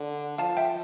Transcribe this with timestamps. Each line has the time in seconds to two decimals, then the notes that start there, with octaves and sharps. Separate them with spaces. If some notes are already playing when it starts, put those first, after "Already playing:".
Already playing: D3
0.38 F3 F5 A5
0.57 E5 G5